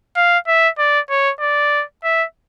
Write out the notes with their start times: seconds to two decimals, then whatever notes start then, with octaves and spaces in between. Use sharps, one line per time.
0.17 F5
0.47 E5
0.79 D5
1.10 C#5
1.41 D5
2.04 E5